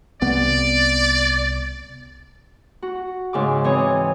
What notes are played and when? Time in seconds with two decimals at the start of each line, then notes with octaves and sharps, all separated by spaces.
0.22 C2 B3 D5
2.82 F#4
3.33 G#2 C#3 D6
3.64 E3 C4 C#5 D#6